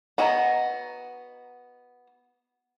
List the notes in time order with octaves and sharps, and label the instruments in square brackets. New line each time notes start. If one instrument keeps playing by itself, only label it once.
[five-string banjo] B3 F#4 D#5 G#5 A#5